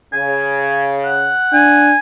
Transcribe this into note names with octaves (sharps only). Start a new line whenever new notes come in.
C#3 G#5
F#5
D4 G#5